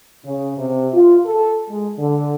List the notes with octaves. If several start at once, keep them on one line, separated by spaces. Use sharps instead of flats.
C#3
C3
F4
A4
G#3
D3